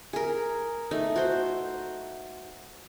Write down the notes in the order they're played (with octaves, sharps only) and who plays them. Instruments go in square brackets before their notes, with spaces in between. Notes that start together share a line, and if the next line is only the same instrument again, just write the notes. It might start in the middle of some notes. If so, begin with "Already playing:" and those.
[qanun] G#4 A#4
A3 D#4
F#4 C5